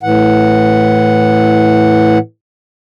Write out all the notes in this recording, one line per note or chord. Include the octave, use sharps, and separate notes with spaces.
A2 E3 F#5